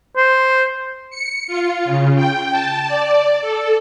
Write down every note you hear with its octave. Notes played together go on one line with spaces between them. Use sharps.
C5
C#7
F4
C#3
G5
A5
D5
A4